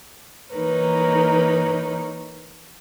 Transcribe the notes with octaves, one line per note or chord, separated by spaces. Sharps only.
E3 A#3 D#4 A#4 B4 C#5